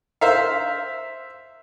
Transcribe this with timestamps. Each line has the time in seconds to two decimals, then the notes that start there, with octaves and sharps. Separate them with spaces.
0.21 C5 E5 F5